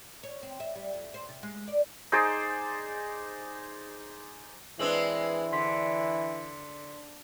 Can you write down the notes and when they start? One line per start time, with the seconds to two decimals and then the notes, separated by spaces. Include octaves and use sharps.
0.23 C#5
0.43 C4
0.60 E5
0.76 G3
0.94 F2
1.14 C5
1.29 C3
1.43 G#3
1.68 D5
2.12 D#4 G#4 C5 D5
4.79 E3 G#3 C4 D4 B4 E6 F#7
5.52 D3 C6 B6